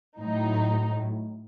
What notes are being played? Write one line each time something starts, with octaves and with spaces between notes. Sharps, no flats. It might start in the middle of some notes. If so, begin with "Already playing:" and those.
A2 F#3 D#4